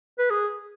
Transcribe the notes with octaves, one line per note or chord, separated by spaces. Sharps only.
B4
G#4